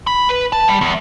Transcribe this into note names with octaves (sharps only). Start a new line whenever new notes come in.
B5
B4
A5
G3
E2